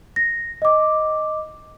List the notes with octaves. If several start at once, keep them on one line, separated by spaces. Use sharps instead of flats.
A#6
D#5 D6